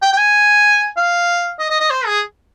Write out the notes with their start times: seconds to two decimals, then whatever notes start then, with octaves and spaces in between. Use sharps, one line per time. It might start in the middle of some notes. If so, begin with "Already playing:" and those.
0.02 G5
0.13 G5
0.18 G#5
0.97 F5
1.59 D#5
1.70 D#5
1.80 D#5
1.90 C5
2.06 G#4